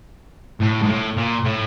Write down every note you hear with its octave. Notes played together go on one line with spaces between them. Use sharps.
A2
G#2
A2
A#2
A2